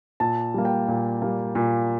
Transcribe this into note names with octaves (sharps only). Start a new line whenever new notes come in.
A#2 A5
G3 A#3
G5
A#2
G3 A#3
A#2